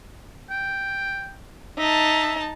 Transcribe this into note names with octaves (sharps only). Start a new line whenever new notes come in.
G5
D#4 E5 A5